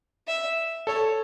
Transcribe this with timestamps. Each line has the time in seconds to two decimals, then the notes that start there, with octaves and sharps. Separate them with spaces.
0.27 E5
0.87 A4 C#5